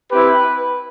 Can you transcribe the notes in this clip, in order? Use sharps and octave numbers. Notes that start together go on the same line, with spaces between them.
C4 E4 G4 B4